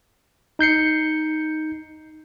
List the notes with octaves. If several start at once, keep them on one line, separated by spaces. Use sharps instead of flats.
D#4 G6 C7 C#7